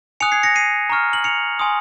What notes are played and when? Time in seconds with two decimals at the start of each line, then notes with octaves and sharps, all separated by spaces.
0.20 G#5 D#6 F#6 C#7 F7
0.32 G#6 C7
0.43 A#6 C#7
0.56 C7 D#7
0.90 A#5 C#6 F6
1.13 F#7
1.24 C#7 F7
1.59 G#5 C6 D#6